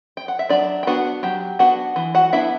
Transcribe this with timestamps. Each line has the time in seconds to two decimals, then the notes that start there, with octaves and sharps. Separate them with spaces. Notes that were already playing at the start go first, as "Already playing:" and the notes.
0.17 G5
0.28 F#5
0.39 E5
0.49 F#3 D4 D5
0.83 G5
0.87 B3 D4 F#4 F#5
1.23 F#3 G4 G5
1.59 B3 D4 F#4 F#5
1.96 E3
2.15 F#4 F#5
2.32 B3 D4 E4 E5